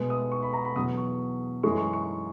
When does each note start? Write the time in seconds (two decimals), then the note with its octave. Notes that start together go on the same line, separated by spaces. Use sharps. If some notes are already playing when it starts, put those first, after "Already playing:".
Already playing: B2 G#3 B3
0.10 D#6
0.32 C#6
0.43 B5
0.53 A#5
0.65 B5
0.76 E2 B2 F#3 D#6
0.97 C#6
1.63 F#2 E3 G#3 C#4 C#6
1.78 C#6
1.93 C#6